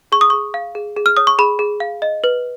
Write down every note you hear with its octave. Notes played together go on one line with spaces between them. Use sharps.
G#4 C#6
D#6
G#4 C#6
F5
G#4
G#4
F6
C#5 D#6
C#6
G#4 B5
G#4
F5
D#5
B4